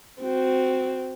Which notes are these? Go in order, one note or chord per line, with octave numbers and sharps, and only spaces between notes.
C4 F#4